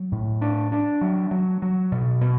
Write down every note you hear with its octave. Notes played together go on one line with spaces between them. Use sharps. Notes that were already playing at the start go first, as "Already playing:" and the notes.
Already playing: F#3
A2
D4
D4
F#3
F#3
F#3
B2
B2